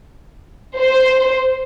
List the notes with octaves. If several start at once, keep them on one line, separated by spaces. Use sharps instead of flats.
C5